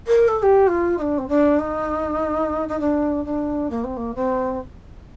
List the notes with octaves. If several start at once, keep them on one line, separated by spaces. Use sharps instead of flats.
A#4
A4
A4
G4
F4
D#4
D4
C4
D4
D#4
D#4
D4
D4
A#3
C4
A#3
C4